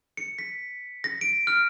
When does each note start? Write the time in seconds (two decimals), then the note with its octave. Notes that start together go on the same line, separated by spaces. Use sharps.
0.17 C#7
0.38 B6
1.04 A#6
1.21 D7
1.47 F6